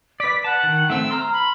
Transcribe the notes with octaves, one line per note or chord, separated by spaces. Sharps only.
B4 D5 B6
F#5 A5
D#3
A3 C4 E6
A#5 C6 F6
B5